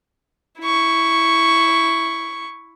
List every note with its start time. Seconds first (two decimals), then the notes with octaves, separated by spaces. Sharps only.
0.60 E4 C#6